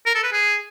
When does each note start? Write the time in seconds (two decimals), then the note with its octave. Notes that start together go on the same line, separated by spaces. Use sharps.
0.06 A#4
0.15 A4
0.23 B4
0.32 G#4